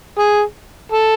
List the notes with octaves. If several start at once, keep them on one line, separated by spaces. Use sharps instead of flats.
G#4
A4